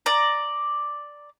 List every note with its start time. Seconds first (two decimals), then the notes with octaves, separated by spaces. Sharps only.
0.06 D5 A#5